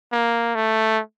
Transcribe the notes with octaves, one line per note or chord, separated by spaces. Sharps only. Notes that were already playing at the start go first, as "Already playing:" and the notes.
A#3
A3